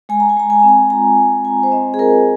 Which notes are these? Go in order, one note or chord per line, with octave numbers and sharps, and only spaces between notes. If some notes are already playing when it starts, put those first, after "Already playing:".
G#3 G#5
A#5
G#5
G#3 A#5
G#5
C4 A#5
G#5
F4 A#5
G#3
G#3 G#5
C5
C4 D#5
G#4
F4 A#4